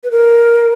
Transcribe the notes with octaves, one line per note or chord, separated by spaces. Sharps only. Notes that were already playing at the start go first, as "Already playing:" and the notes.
B4
A#4